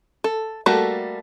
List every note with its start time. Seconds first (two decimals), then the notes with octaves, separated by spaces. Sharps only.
0.24 A4
0.66 G3 A3 A#3 F#4 A4